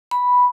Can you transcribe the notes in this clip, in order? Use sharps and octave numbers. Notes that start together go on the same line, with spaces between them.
B5